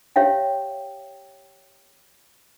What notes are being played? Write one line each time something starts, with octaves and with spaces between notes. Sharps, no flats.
G4 C#5 E5 F5 G5